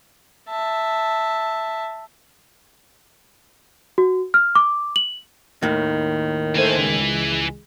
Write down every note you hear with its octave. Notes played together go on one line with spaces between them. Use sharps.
E5 A5
F#4
F6
D6
F#7
D#2 A2 D#3
E3 A3 C5 G#5
C#2 G#3